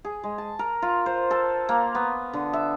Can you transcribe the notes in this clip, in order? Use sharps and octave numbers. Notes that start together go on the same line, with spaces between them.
G#4
G#3
A5
A#4
F4
C5
A4
A#3
B3
D3
E5